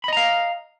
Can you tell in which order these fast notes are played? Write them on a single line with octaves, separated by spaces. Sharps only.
B5 D#5 A#5 F5